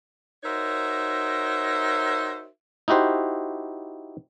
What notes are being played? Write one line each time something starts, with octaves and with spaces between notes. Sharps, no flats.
D#4 F#4 A#4 C5 C#5 E5
D#4 E4 F#4 G4 C5